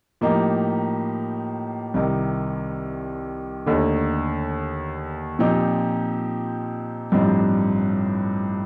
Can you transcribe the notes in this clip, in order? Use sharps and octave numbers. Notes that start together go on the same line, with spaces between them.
A2 F3 A#3 D#4 G4
C2 C3 D#3
D#2 D3 A3 D#4
A#2 F3 C4 D#4 G4
A1 G2 F3 C4 D#4